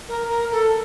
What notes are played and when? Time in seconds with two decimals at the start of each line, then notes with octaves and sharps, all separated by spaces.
0.08 A#4
0.29 A#4
0.51 A4